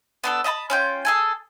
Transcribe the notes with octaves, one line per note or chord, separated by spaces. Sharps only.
B3 D4 A4
D#5 E5 A5 B5
C#4 F4 G5
G#4 A4 G#5